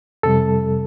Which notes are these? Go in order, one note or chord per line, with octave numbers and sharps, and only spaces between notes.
F2 C3 G3 A4